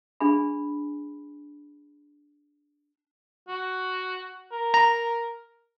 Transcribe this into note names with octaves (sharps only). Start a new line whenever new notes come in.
D4 G#4 G#5 B5
F#4
A#4
A#5